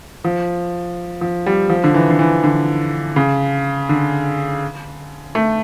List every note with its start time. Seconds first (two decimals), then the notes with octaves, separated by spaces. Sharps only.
0.24 F3
1.21 F3
1.46 G3
1.70 F3
1.84 D3
1.94 E3
2.10 D3
2.19 E3
2.43 D3
3.16 C#3
3.89 D3
5.35 A3